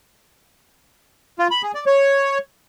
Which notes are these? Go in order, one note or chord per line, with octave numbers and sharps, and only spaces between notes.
F4
B5
G#4
D5
C#5